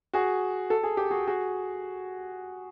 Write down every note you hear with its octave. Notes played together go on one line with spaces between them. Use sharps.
F#4 G#4
A4
G#4
G4
F#4 G#4
F#4 G#4